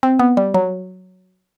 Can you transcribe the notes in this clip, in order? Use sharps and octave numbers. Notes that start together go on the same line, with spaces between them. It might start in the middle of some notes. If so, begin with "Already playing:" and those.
C4
B3
G3
F#3